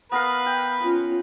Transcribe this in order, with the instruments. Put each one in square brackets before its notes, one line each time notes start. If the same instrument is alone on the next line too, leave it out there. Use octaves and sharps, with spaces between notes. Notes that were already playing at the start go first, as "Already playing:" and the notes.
[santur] B3 A#4 F5 [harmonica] B4
[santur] G5
[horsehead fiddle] C#4 F4